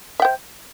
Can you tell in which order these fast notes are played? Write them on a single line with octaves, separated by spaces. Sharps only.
E5 G5 C5